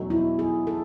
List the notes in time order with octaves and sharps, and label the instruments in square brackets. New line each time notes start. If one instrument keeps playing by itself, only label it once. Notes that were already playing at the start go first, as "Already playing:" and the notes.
Already playing: [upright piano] E2 B2 F#3 A3 D#4
[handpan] E4
G#4
A4